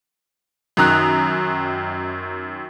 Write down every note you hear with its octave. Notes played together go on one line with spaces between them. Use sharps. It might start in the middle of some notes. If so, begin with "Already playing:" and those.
F#2 D#3 A#5 D#6 F#6